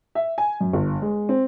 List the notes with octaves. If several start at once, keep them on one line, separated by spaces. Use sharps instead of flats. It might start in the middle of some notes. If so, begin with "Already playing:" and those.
E5
G#5
F#2
G1
G#3
C4